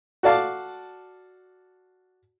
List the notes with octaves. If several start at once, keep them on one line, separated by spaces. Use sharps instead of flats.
F#4 A4 D5 F5 A5 D6